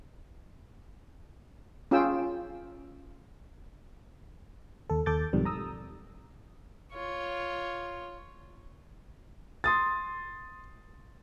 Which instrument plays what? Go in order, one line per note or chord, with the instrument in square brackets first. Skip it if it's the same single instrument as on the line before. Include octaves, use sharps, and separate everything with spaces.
[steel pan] C#4 F4 G#4 G5 E6
[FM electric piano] D#2 A4
D#2 A4 D6 G6 A6
B1 F2 G#2 D#3 G3
A#5 D#6 E6
[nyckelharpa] F4 C#5
[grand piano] C6 D#6 A6